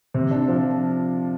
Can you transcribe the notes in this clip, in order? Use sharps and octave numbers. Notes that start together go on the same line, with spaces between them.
C3
D4
F3